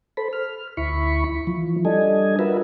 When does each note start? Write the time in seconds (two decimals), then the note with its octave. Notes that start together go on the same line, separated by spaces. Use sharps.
0.17 A4 C5 B5
0.33 F6
0.77 D2 E4 B5 C#6
1.47 E3 F3
1.85 G3 D4 A4 D#5 G#5
2.39 F4 F#4 A#4 B4 E5